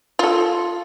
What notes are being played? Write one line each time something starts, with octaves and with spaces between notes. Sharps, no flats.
F4 A4